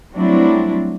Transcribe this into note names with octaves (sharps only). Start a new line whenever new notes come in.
F#3 G3 A3 C4 D4 E4